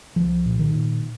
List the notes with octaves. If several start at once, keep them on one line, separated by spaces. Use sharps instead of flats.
C2 F3
A#2
D#3
A#2